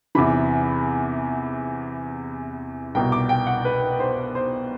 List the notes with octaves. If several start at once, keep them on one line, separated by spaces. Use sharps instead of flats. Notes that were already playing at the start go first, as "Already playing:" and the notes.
E2 C3 E3 B5
C2 B2 G5
D6
G5
F#5
B4
C5
C5